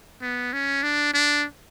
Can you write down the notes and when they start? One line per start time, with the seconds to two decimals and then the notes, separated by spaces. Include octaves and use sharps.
0.22 B3
0.53 C#4
0.83 D4
1.14 D4